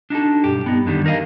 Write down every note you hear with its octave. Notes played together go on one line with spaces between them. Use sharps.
D4 D#4 F#4 A4
B1 G2 G4
G2 B3 D#4
F#2 D3 D#3 G3
D#4 A#4 B4 D#5 F5